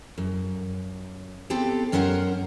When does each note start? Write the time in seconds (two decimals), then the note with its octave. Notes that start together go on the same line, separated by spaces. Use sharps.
0.18 F#2
1.50 B3 C4 G4 A4
1.92 F#2 C#4 A#4 C5 F#5 A#5